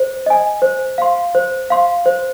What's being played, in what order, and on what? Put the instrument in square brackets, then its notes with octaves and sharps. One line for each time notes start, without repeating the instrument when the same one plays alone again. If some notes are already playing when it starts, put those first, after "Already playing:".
Already playing: [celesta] C5
D#5 G#5
C5
F5 C6
C5
F5 C6
C5